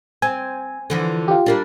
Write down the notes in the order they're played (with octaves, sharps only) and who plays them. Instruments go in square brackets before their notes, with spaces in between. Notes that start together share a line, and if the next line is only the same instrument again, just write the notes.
[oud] C4 [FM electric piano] G#5
[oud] D3 E3 F3
[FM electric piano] F4 G4
[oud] G3 A#3 D4